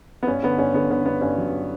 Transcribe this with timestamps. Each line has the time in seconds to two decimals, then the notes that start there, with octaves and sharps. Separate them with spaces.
0.23 B3
0.27 G2 C#4
0.43 D3 B3
0.58 G2 C#4
0.74 D3 B3
0.90 D3 B3
1.06 G2 B3
1.21 G2 C#4
1.38 F#3